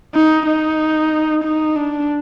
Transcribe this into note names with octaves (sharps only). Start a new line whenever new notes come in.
D#4
D#4
D#4
D4